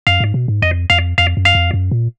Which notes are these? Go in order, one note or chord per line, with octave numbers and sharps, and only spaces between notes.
F#2 F5
G#2
B2
G#2
F2 D#5
F2 F5
F2 F5
F#2
F5
F2
F#2
A#2